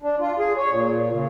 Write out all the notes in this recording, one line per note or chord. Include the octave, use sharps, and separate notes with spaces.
D4
F4
G#4
C#5
A#2
C#3